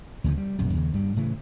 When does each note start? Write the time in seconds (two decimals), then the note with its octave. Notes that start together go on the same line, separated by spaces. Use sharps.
0.24 D2 C#3 F3
0.38 G3
0.59 A#1 F#2 C3
0.74 D#2 C#3
0.93 G2 G3
1.16 A2 C#3 E3